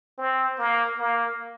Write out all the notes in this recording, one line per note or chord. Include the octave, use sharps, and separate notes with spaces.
C4
A#3
A#3